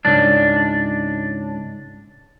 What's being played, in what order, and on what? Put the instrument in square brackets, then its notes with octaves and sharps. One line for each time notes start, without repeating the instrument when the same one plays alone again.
[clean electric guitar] C#2 G#2 D4